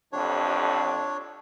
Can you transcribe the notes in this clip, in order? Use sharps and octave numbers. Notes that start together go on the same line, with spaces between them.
A1 F2 C3 D4 C#5